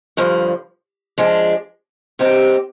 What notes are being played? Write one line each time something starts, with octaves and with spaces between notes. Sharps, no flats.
G2 D3 F3
F3 G#3 D4
C3 G3 C4 D#4 G4